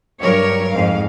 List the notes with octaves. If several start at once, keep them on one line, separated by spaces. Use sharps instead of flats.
G2 F#3 A#4 C#5
F2 G#2 F5